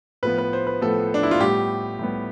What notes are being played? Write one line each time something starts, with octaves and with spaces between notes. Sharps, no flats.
A2 F3 B3 B4
B4
C5
B4
A2 F3 B3 A4
D4
E4
F4
A2 G3 B3 G4
A2 G3 B3